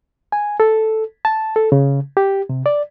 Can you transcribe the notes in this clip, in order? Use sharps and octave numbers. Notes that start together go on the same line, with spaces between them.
G#5
A4
A5
A4
C#3
G4
C3
D5